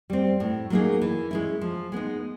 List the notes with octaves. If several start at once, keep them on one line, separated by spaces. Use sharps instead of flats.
G3 C4
A2
F#3 A#3 D#4 G#4
E3
G#3 C#4 E4
F3
G#3 B3 D#4